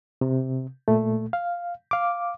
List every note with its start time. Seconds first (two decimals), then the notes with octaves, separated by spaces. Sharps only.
0.21 C3
0.88 A#2 A3
1.33 F5
1.91 F5 D6